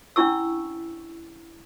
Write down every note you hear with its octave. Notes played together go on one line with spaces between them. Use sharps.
C#4 D4 E4 C#6 E6